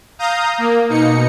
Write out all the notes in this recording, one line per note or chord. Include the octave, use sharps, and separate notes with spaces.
F5 A#5 D#6 G6
A#3
B2 D#4 C#7